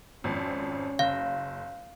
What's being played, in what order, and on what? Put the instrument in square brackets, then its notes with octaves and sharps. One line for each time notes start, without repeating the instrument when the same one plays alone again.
[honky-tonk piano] G#1 F2 [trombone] C#4
[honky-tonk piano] F#1 [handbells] F5